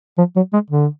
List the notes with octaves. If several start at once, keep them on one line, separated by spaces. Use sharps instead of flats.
F3
F#3
G#3
D3